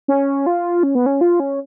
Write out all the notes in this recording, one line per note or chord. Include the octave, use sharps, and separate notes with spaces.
C#4
F4
C#4
B3
C#4
F4
C#4